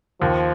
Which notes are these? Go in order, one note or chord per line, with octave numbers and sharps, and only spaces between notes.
D#2 F3